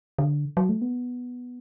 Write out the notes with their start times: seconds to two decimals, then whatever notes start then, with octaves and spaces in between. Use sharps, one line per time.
0.19 D3
0.57 F#3
0.69 A3
0.82 B3